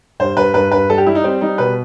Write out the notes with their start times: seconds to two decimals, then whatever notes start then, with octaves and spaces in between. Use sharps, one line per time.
0.20 G2 C5
0.37 G2 B4
0.54 G2 B4
0.72 G2 B4
0.90 G3 A4
0.98 G4
1.06 G3 E4
1.15 D#4
1.24 G3 C4
1.41 G3 D#4
1.58 B2 B4